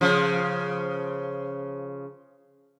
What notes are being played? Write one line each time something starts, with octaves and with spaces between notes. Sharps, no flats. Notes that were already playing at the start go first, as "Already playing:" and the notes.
C#3 F3